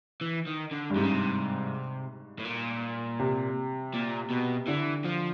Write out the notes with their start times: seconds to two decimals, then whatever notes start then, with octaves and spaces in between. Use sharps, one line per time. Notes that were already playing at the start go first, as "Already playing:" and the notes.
0.21 E3
0.46 D#3
0.71 D3
0.90 G2
0.96 G#2 C3
1.04 C#3
1.11 C3
2.39 A2
2.45 A#2
3.19 C3
3.94 A#2
4.31 B2
4.67 D3 E3
5.05 F3